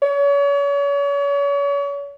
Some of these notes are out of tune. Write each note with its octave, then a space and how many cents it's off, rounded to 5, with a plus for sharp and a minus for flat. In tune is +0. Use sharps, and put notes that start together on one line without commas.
C#5 +35